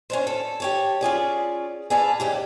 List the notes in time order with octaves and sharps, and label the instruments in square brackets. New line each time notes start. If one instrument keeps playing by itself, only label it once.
[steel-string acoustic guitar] C#4 D4 C5
A4
G4 C#5 A5
C#4 F4 G#4 D5
G#4 B4 D5 E5 F5 A5
D#2 C#3 G4